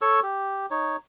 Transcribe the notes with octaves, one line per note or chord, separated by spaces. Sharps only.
A4 C#5 C#6 E6
G4
D#4 C#5